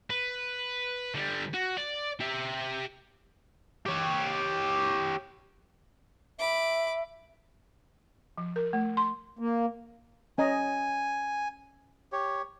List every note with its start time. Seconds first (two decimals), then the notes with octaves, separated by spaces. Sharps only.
0.10 B4
1.15 D3 G3
1.54 F#4
1.77 D5
2.20 G4 E5
3.86 G4 C#5
6.39 E5 B5 D6
8.38 F3
8.56 A#4
8.73 A3
8.97 C6
9.39 A#3
10.38 C#4 D#5 G#5 A#5
12.12 G4 C#5